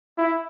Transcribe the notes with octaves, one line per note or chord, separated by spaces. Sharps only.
E4